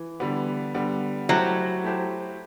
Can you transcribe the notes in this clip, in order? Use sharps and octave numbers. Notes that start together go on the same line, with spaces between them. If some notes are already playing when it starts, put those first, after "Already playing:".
Already playing: E3
D3 G3 B3
D3 G3 B3
F#3 A3 E4 G4 C5
A3 E4 G4 C5